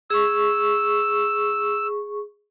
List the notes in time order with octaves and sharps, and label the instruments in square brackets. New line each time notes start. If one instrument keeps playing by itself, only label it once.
[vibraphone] G#4 C#6 [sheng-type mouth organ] E6